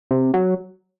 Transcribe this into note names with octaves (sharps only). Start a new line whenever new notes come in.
C3
F#3